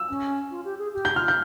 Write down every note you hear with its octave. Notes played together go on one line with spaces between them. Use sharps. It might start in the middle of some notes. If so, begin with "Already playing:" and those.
Already playing: E6
C#4
F4
G4
G#4
G4
G6
F4 F6
G6